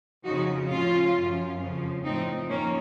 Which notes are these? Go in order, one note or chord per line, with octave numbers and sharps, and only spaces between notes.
F2 C#3 F3 D#4 F#4
A2 F3 C#4 F4
F#2 F3
F2 C#3 F3
A2 F3 C4 D#4
F2 D#3 A#3 C#4